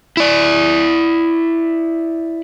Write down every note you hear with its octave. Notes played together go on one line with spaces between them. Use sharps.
E4 D5